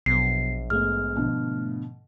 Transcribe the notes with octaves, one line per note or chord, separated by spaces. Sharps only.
A#1 B2 F#3 B3 C7
G#2 G#3 A3 B3 F6
B2 D3 F3